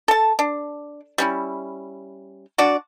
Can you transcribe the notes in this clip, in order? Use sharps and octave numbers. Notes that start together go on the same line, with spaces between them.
A4 A5
D4
G3 C#4 E4
D4 F#4 D5